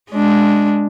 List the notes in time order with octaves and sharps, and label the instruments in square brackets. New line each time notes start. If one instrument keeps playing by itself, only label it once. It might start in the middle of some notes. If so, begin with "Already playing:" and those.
[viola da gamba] G#3 D4